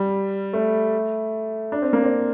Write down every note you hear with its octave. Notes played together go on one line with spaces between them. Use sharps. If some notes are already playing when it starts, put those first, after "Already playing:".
Already playing: G3
A3
D4
C4
A#3
C4